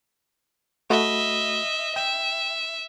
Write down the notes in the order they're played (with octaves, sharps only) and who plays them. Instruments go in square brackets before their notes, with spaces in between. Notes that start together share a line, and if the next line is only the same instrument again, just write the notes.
[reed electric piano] A3 F#4 B5 [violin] D#5 E5
[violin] E5 [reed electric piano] G5